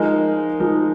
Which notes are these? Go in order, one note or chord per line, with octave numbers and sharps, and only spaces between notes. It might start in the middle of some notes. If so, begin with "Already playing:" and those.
Already playing: F3 G#3 D#4 A#4
F3 G#3 D#4 A#4